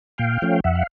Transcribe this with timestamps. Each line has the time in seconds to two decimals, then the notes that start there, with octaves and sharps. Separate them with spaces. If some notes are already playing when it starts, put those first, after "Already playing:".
0.18 A#2 F5 G5
0.42 F3 A3 C#4
0.64 F2 E5 F#5
0.75 F5